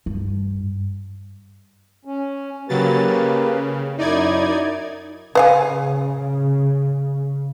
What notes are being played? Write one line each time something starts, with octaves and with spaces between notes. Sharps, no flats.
G2
C#4
C#3 F#3 A#3 G4 B4 A6
C#3
F#2 D#4 E4 D5 G#6
C#3 B4 F5 G#5